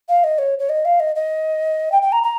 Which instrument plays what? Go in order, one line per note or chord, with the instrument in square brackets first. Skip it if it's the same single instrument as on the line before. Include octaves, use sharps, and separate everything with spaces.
[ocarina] F5
D#5
C#5
C#5
D#5
F5
D#5
D#5
G5
G5
A#5
A#5